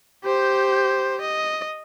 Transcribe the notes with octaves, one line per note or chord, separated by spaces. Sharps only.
G4 C5
D#5